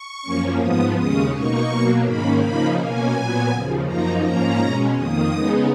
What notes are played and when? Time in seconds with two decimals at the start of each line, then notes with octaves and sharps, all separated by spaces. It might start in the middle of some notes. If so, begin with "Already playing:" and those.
Already playing: C#6
0.22 F#2 F3 A#3 C#4
0.58 G#2 F3 B3 D#6
0.95 D#2 C#3 G#3 C#4 D#6
1.31 B2 A#3 D#4 C#6
1.67 B2 F#3 A#3
2.04 G#2 D#3 A#3 C#4 B5
2.40 C#3 F3 A#3 D#4 B5
2.76 B2 A#3 C#4 G#5
3.12 A#2 F#3 B3
3.48 D#2 C#3 F3
3.85 F#2 F3 A#3 D#4 A#5
4.21 G#2 F3 A#3 C#4 A#5
4.57 B2 G#3 C#4
4.94 F2 D#3 A#3 D#6
5.30 C#3 G#3 B3 D#4